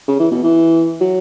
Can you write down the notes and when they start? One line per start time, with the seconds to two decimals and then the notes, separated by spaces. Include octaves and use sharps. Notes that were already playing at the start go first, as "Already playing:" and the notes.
0.08 C#3
0.19 E3
0.31 B2
0.44 E3
1.01 F#3